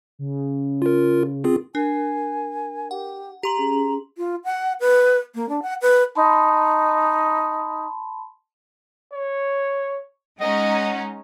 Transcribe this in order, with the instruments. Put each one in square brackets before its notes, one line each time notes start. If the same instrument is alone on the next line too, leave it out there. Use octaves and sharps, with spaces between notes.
[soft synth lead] C#3
[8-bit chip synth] F4 A#4
C4 F4 G#4
[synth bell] D4 [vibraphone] A#4 [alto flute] G#5
[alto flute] G4 [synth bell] F#5
[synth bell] G4 C6 F#7 [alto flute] A#5
[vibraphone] C#4 G#4
[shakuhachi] F4
F#5
B4
A#3
D4
F#5
B4
[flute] D#4 [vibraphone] A5 B5 C6
[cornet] C#5
[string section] G#3 C#4 D#4 [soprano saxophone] D#5 [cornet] F#5